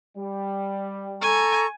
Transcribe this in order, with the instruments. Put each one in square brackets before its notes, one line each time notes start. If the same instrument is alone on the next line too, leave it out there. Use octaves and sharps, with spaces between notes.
[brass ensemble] G3
[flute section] A4 A#5 C#6 [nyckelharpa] G#5